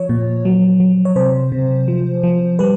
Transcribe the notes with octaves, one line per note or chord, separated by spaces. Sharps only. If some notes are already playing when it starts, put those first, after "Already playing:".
Already playing: F3 C#5
A#2
F#3
F#3
C#5
C3 C5
C3
F3
F3
G3 B4